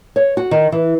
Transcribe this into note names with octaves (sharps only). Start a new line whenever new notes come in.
C#5
F#4
D#3
E3